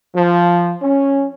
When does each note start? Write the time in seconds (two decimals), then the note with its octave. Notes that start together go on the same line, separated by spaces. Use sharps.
0.15 F3
0.82 C#4